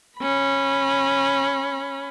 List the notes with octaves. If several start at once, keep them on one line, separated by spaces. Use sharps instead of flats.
C#4 B5